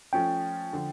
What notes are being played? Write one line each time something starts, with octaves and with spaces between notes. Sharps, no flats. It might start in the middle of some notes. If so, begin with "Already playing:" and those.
F3 A3 C#4 G5
D3 F3